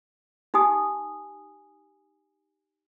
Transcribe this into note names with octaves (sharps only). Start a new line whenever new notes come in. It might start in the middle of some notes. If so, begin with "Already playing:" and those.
D#4 G4 G#5 D#6